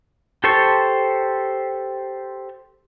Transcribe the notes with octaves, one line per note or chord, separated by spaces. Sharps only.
G4 A4 C5 A5 C#6